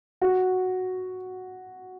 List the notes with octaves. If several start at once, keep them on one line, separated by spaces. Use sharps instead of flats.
F#4